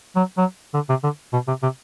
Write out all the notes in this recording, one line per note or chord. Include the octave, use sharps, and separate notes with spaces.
F#3
F#3
D3
C3
D3
B2
C3
C3